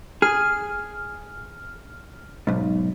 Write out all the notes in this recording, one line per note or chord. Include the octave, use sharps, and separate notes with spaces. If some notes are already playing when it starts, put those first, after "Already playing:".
G#4 F6
B1 G#2